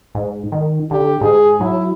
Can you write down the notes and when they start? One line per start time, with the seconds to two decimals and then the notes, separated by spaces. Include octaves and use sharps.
0.15 G#2
0.52 D#3
0.91 D3 G4
1.21 G#2 G#4
1.61 F#3 E4